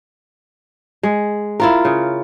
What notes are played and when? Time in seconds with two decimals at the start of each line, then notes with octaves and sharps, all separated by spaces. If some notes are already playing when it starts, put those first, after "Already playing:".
1.03 G#3
1.60 E4 F4 A#4
1.85 C#3